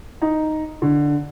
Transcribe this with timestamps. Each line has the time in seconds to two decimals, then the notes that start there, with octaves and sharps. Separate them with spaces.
0.22 D#4
0.82 D3